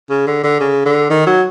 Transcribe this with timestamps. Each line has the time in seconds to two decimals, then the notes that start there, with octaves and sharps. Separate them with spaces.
0.10 C#3
0.27 D3
0.44 D3
0.60 C#3
0.86 D3
1.10 D#3
1.27 F#3